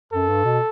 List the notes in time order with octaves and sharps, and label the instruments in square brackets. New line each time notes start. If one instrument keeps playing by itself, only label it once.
[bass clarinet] F#2 [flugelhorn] A4
[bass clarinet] G2
B2